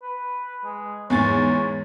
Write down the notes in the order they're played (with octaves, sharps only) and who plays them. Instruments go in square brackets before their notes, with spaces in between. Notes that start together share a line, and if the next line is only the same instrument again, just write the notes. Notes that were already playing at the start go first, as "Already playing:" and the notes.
[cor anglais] B4
G#3
[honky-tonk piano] E2 G#2 A6 [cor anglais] C#5